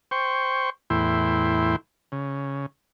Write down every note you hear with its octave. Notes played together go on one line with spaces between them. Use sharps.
C5 G5 C#6
E2 A2 E4 G5 C6
C#3